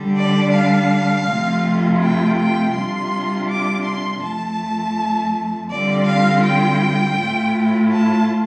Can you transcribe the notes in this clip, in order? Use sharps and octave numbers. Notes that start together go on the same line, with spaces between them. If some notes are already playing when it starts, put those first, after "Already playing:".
Already playing: D3 G3 D4
D5
F5
F2 C3 A3 C4 F4
G5
G5
C3 G3 D4 F4 C6
D6
C6
F2 F3 A3 A5
D3 G3 C4 F4 D5
F5
G5
A2 A3 F4
A5